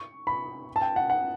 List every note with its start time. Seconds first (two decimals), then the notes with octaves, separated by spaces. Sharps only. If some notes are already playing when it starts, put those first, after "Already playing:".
Already playing: C#6
0.27 B5
0.76 A5
0.82 G5
0.96 F#5
1.10 F#5